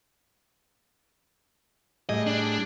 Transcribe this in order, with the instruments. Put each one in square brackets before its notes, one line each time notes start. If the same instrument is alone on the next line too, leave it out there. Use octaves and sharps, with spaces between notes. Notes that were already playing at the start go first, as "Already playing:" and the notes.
[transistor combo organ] A2 G3 G#4 [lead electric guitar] D#5
[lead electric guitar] D4